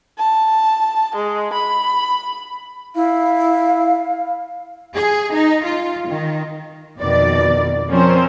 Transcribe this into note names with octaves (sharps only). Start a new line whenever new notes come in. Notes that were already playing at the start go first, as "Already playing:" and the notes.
A5
G#3
B5
E4 F5
G#4
D#4
F4
D#3
F2 B2 D#3 D5
F3 C4 C#4 A#4 C5